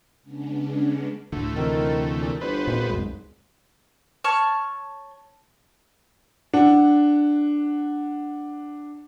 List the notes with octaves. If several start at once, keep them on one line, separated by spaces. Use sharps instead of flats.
C#3 G#3 B3 C#4 D4
D2 A2 D3 A3
C3 D#3 E3
A#2
G1 B3 B4 C5
G#1 A#2
C2 F#2 G#3
C#5 A5 C#6 F6
D4 F#5